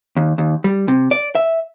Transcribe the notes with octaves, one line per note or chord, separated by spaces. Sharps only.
D#2
D#2
G3
C3
D5
E5